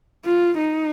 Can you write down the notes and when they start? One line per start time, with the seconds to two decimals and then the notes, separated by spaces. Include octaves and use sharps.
0.25 F4
0.57 D#4